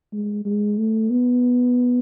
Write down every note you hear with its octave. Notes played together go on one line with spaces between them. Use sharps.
G#3
G#3
A3
B3